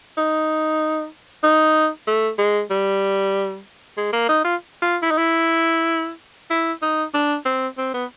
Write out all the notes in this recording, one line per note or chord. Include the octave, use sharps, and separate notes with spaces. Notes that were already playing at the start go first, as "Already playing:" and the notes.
D#4
D#4
A3
G#3
G3
G#3
A#3
D#4
F4
F4
E4
D#4
E4
E4
D#4
D4
C4
C4
B3